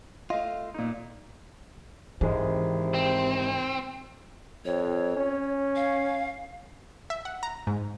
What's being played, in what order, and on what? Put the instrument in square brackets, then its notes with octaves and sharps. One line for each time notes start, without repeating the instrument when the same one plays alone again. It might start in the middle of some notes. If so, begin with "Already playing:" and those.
[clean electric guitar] A3 F4 [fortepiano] D#5 F5
[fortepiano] A#2 D#4
[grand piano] G#1 G#3 [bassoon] C3 [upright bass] E3
[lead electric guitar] C4
[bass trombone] F2 [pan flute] C#5
[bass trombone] C#4
[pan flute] F5
[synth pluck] E5
F#5
A#5
G#2